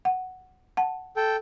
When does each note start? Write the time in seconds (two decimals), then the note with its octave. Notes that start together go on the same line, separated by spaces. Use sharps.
0.05 F#5
0.77 F#5 A5
1.16 A4 G5